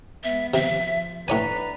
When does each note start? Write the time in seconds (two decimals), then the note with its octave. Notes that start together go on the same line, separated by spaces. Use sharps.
0.23 G#3 B3 E5
0.54 C3 F3 E5
1.28 A2 D4 B4 C#5 G#5 A#5